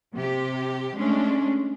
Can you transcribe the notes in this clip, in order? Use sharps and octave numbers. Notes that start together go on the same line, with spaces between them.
C3 G4
G#3 A3 C#4 D4